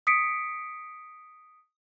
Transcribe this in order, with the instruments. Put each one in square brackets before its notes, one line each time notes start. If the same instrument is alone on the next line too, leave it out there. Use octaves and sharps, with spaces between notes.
[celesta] D#6 B6 C#7 D7